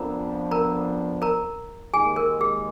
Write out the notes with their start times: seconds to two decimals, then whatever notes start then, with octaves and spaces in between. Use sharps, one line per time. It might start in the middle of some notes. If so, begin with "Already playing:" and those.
Already playing: F2 F3 B3 D4 A#4 A#5
0.51 A#4 A#5
1.22 A#4 A#5
1.93 D#2 D#3 G#3 G#4 G#5
2.16 A#4
2.41 G#4